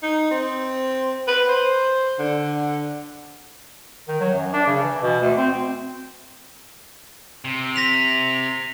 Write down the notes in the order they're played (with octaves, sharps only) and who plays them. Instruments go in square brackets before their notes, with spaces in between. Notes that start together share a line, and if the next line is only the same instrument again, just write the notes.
[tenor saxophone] D#4
C4
B4
C5
D3
[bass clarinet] D#3
F#3
F#2
D4
C#3
E3
B2
D2
C4
[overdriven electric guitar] C3
[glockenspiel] A#6 B6 F7